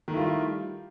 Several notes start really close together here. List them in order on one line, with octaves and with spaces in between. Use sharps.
D#3 A3 E4 F4 G3